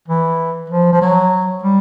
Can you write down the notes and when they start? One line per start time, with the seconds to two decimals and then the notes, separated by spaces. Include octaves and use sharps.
0.08 E3
0.70 F3
0.93 F3
1.02 F#3
1.64 G3